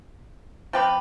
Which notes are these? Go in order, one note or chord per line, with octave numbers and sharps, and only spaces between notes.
F3 C4 G4 B4